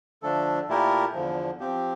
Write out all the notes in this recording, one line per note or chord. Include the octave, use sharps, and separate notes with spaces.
D3 F3 A3 D4 A4
A#2 A3 E4 G4 A#4
E2 D3 F3
F3 C4 G4